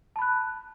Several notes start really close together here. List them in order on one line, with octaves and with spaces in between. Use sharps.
A5 B5 F#6